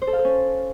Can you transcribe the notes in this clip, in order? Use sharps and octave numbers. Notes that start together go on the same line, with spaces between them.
C5
A4
F5
A4
C#4